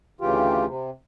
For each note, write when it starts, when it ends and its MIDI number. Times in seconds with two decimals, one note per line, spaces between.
0.21 0.65 38
0.21 0.65 49
0.21 0.65 52
0.21 0.65 65
0.21 0.65 67
0.66 0.90 48